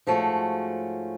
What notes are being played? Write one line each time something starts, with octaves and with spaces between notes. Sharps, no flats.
G#2 F3 A3 C#4 F#4